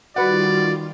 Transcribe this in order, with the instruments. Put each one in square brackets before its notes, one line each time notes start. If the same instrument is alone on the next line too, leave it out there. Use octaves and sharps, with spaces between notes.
[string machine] D#3 G3 F4 [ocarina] F#4 [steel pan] B4 F#5 [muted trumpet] D5